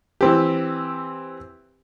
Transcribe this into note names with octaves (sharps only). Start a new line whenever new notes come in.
E3 C4 G4